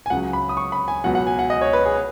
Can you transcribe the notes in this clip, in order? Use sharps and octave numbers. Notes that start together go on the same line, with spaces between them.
G#5
C#2 C#3 F#3 F#5
B5
D#6
C#6
B5
G#5
C#2 B2 F#3 F#5
F#5
G#5
F#5
D#5
C#5
B4
G#4